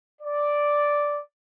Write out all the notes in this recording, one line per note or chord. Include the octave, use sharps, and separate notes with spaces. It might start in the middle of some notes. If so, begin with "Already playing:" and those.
D5